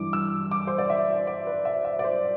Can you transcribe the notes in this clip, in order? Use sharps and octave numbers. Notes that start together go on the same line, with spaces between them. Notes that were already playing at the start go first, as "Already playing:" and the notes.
Already playing: G2 E3 D6
E6
D6
C5
D5
E5
D5
B4
E5
E5
D5
C5